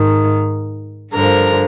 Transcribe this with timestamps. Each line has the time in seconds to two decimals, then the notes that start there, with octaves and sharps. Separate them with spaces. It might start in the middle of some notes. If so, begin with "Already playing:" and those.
Already playing: G#2 D#3
1.12 G2 D3 F3 A#4